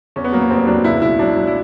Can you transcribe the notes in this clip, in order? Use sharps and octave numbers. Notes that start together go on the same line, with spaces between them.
E2 C#4
B3
F#3 A#3
B3
F1 C4
F#3 D4
C#2 E4
B2 E4
F#3 D4
F#3
E4